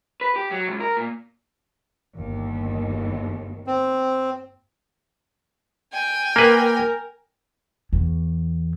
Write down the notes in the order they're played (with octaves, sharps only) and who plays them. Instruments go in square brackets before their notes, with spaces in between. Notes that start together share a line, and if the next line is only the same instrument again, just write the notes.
[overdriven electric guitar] B4
G4
F#3
C#2
A#4
A#2
[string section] G1 D#2
[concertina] C4
[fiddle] G5 G#5
[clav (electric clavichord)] A#3 B4 [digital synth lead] A#4
[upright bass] E2